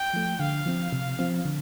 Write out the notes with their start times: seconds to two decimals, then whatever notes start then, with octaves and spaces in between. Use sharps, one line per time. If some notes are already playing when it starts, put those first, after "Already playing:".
Already playing: G5
0.13 F3 A3
0.39 D3 F5
0.66 F3 C4
0.92 C3
1.19 F3 C4
1.45 D3